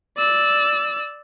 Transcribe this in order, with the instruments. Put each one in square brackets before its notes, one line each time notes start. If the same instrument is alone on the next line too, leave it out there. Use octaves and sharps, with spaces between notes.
[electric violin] D5 E6